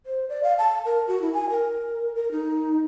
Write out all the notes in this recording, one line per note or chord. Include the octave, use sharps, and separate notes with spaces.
C5
D5
F5
A5
A#4
F#4
E4
G#5
A#4
A#4
D#4